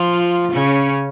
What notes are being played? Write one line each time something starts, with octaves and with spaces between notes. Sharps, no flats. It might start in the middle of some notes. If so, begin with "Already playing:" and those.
Already playing: F3 F4
C#3 C#4